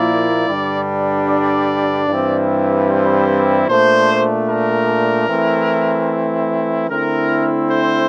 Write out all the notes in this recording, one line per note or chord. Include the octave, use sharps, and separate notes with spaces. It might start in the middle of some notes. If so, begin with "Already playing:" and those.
Already playing: A#2 F3 A#3 E4 D5
G2 D3 G3 D4
D5
G2 E3 G3 C4 E4
C5
A#2 A3 D4 C5
A#4
E3 A3 C4 E4
D3 A3 C4 E4 A#4
C5